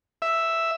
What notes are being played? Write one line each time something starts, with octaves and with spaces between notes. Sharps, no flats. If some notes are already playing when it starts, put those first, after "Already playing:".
E5